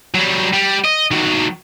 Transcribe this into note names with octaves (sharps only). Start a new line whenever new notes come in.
F#3 G3
G3
D#5
D#3 F#3